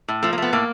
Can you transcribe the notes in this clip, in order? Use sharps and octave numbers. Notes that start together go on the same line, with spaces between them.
A2
F3 A3
A#3
A3 B3
A2 A#3